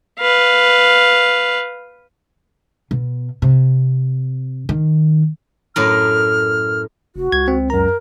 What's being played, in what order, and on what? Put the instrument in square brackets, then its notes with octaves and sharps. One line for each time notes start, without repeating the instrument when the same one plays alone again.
[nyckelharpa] B4 F5
[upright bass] B2
C3
D#3
[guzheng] F#2 A2 A#4 [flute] F6
[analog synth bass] F1 [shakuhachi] F#4
[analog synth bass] C#2 [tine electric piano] G#6
[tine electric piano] C4
[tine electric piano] F#2 A#5 [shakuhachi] A#4